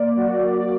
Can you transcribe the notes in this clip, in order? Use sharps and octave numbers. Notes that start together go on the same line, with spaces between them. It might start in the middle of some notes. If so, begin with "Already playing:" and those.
Already playing: A#3 D5
F#3 F#4